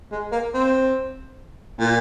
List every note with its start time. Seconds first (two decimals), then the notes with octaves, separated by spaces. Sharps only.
0.12 G#3
0.32 A#3
0.54 C4
1.79 A#2